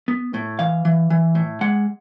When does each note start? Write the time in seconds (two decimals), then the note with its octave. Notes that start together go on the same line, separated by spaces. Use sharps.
0.08 B3
0.34 A2
0.59 E3 F5
0.85 E3
1.10 E3
1.35 A2
1.61 G#3 F#5